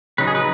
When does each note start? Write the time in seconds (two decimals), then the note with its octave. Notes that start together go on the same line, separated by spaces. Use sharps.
0.18 C#3 F#3 D#4 B4
0.27 G#4
0.35 B4